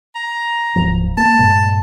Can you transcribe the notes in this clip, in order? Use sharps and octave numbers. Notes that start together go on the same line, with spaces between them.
A#5
D1 G#2 F3
A#3 A5
G2 A#2 G#3